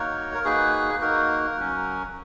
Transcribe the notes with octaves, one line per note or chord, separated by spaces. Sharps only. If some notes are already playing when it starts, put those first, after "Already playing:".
Already playing: A#3 D#4 F#4 A#4 C#5
A#4
A#3 D#4 F#4 G#4 B4
A#3 D#4 F#4 A#4
F#3 C#4 F#4